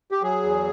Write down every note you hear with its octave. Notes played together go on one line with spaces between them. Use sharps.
G4
F#3 G#4
E2